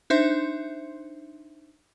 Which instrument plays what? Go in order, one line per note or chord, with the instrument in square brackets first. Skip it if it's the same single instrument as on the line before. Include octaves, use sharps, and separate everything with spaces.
[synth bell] D4 D#4 C5 E5 C6 G6